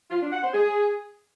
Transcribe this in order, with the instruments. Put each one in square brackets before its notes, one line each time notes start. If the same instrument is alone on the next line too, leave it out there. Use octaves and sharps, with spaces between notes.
[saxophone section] F4
D4
F#5
C5
G#4